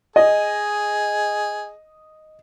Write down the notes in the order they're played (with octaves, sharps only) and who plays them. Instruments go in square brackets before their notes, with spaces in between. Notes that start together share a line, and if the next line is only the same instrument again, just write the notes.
[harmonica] G#4 [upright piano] D#5